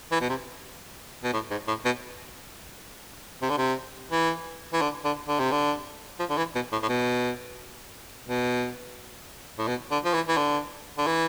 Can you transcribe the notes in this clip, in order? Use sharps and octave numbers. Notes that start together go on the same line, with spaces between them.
E3
B2
C3
B2
A2
G#2
A2
B2
C3
D3
C3
E3
E3
D3
D3
D3
C3
D3
F3
D3
E3
B2
A2
A2
B2
B2
A2
B2
D3
F3
E3
E3
D3
D3
E3